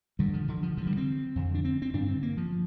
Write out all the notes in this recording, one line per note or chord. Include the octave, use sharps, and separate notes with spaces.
G2 D3 G3
F3
D3
F3
G2 D3 F3
G3
C4
F2 D3
D4
C4
C4
G2 D3 D4
C4
A#3
F3